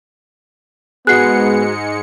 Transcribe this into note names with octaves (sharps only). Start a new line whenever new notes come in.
G#2 G#3 B3 F#4 G#4 F#6 C7 C#7